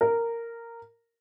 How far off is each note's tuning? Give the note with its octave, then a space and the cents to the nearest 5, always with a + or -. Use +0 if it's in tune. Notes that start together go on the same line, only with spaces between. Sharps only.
A#4 -10